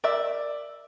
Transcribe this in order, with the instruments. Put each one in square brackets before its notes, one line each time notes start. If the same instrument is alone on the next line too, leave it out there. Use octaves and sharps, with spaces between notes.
[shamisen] A#4 E5 [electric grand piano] D5